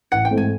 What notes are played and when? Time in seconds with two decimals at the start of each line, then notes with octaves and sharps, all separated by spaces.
0.12 A1 F#5
0.25 G5
0.31 G#2 E3 A3 C4
0.37 G#5